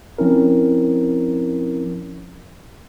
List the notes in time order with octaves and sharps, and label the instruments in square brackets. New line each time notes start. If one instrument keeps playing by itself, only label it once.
[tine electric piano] F3 C4 C#4 E4 A#4